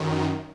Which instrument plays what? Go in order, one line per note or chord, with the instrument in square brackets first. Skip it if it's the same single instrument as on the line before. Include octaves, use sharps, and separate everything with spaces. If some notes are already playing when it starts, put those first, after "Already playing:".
Already playing: [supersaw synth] F#2 D#3